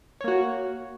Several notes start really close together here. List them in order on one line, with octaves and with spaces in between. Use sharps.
C#5 A#3 F#4